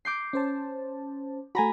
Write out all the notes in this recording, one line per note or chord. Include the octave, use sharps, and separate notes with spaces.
D6 G6 C7
C#4 C5 A5
A3 F#4 G#5 A#5 B5